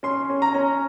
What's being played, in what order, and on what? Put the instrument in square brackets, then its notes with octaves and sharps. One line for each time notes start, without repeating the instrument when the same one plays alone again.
[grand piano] C#4 C6
C#4
A#5
C#4